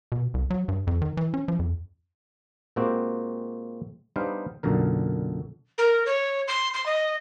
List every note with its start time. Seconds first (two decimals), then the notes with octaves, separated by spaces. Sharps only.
0.12 B2
0.34 C2
0.50 F#3
0.68 G2
0.87 F2
1.02 D#3
1.17 E3
1.34 C#4
1.48 F3
1.59 F2
2.76 A#2 G#3 A#3 C4 F#4 G4
4.16 G3 B3 D4 D#4 C5 F5
4.63 B1 F#2 A#2 D3 A#4
5.78 A#4
6.06 C#5
6.48 C6
6.74 C6
6.86 D#5